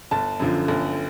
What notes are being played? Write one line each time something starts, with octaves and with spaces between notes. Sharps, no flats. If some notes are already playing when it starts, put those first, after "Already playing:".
G1 A5
F#2 D3 F3
G1